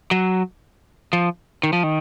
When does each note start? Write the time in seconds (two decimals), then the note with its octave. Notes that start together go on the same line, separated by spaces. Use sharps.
0.11 F#3
1.13 F3
1.63 D#3
1.73 F3
1.83 D#3